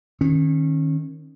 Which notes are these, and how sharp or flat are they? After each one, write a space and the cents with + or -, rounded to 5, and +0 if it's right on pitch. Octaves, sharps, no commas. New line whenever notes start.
D#3 -5 C#4 -25